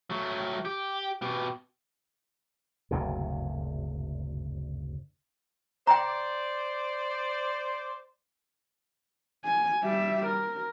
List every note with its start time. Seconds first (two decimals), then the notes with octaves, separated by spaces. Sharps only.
0.10 F#3 A3
0.65 G4
1.22 B2 G4
2.91 F#1 D2 G2 C3
5.87 C5 D5 G5 A#5
9.44 G#5
9.83 G3 E5
10.26 A#4